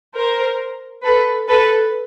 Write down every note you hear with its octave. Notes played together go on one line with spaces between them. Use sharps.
A#4 C5
A4 B4
A4 B4